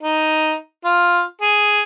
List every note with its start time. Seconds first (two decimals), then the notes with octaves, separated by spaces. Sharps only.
0.03 D#4
0.85 F4
1.41 G#4